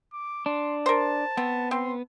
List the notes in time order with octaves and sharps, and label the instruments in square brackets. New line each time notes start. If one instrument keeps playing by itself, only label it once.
[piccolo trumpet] D6
[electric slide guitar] D4 [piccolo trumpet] C6
[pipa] A#4 C5 [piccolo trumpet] A5
[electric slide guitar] B3 [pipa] C4
[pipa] C4 [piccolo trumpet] C6